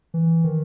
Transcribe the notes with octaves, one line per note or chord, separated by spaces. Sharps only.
E3
D#3